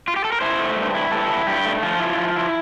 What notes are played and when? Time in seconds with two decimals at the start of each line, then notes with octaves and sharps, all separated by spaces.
0.08 F4
0.16 G4
0.25 A4
0.32 A#4
0.41 E4 C5
0.58 A3
0.77 G2
0.94 E4
1.11 G2 A4
1.30 E4
1.47 G2 G4
1.65 A3
1.83 F3 F4
2.00 E4
2.06 F4
2.18 F3
2.36 E4